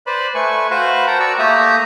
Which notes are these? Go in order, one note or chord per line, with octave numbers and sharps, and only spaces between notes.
B4 C5 D5 B5
A3 B4 G#5 C#6
F#4 B4 C5 F5 B5
A#4 F#5 G5 A5 A#5
F#4 D5 A5 C#6 E6
A3 A#3 G4 E5 A#5 D#6